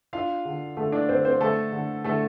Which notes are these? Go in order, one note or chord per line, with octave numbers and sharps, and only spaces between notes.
D4 F4 F5
D3
D3 A3 A4
D4 D5
D3 C4 C5
C4 C5
D3 A3 A4
D3
D3 A3 A4